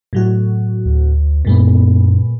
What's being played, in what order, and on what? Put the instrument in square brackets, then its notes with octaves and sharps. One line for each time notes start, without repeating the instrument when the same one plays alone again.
[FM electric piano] A2 F#3 F#4
[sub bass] D2
[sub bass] F#2 [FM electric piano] A#2 G#3 B3